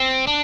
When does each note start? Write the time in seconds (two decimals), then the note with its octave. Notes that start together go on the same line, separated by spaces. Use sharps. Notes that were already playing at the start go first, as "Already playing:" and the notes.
Already playing: C4
0.27 D4